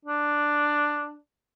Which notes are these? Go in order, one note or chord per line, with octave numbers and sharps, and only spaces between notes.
D4